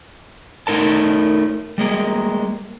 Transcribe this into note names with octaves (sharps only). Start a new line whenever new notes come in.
A3 D#4 A#4 A5
G3 G#3 A#3